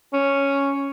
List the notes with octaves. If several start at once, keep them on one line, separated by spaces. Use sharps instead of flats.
C#4